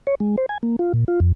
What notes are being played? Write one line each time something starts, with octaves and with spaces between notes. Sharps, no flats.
C#5
G#3
C5
G#5
A#3
F4
A#2
F4
F2